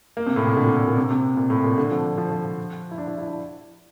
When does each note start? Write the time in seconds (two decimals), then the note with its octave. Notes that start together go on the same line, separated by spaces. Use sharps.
0.17 A#3
0.27 C3
0.36 A2
0.47 A#2
0.57 D3
0.66 A#2
0.76 A2
0.87 A#2
0.97 C3
1.11 C3
1.37 A#2
1.50 A2
1.64 A#2
1.78 D3
1.91 F3
2.18 F3
2.31 F3
2.45 F3
2.91 E4
2.98 D4
3.07 E4
3.18 E4
3.28 D4